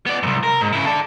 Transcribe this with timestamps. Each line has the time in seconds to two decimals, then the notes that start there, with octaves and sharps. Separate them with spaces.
0.06 B3 D5
0.23 C2 F#2
0.43 A#4
0.61 G#2
0.73 C#3 E4
0.86 D4 A4